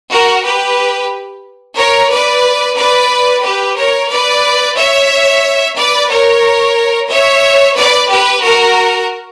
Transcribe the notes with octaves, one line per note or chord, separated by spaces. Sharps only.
F#4 A#4
G4 B4
A#4 C#5
B4 D5
B4 D5
G4 B4
A#4 C#5
B4 D5
C#5 E5
B4 D5
A#4 C#5
C#5 E5
B4 D5
G4 B4
F#4 A#4